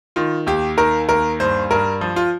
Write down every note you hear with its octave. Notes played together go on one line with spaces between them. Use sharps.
D#3 F4
D#2 G4
D#3 A#4
D#2 A#4
G2 C5
G2 A#4
F3
F4